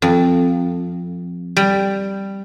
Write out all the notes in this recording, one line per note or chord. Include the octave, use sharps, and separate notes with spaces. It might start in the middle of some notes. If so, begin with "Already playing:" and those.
F2
G3